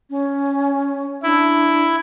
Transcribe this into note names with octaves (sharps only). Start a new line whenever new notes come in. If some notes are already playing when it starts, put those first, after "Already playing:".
C#4
D4 E4